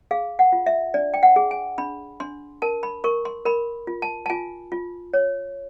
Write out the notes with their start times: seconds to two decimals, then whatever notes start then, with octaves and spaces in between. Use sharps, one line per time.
0.11 G#4 F5
0.39 F#5
0.53 F4
0.66 E5
0.94 D4 D5
1.14 G5
1.23 F#5
1.36 G#4
1.51 G#5
1.78 D4 B5
2.20 D4 C6
2.62 A#4 A5
2.83 B5
3.04 A#4 C#6
3.25 C6
3.45 A#4 B5
3.87 F4
4.02 A5
4.26 A5
4.30 F4 G#5
4.72 F4
5.14 C#5